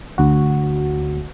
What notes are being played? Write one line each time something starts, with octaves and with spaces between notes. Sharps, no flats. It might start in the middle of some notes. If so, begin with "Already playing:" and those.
D2 F#4